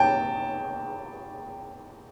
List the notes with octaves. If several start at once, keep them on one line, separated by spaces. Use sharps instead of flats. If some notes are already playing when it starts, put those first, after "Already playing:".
Already playing: G5 A5